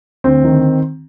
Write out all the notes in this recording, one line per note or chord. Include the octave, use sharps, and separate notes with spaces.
D2 C4
D#3